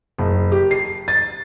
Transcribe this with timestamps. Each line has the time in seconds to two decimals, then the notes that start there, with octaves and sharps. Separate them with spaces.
0.18 F#1
0.52 G4
0.71 C7
1.08 A6